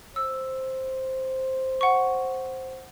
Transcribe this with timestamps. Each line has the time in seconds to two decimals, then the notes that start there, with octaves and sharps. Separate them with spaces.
0.16 C5 E6
1.81 F#5 C#6